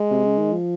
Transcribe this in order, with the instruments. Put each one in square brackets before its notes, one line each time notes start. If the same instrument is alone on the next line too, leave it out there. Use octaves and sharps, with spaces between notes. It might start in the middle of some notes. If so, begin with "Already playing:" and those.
Already playing: [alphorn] G#3
[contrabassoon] C3
C#3
D#3
F3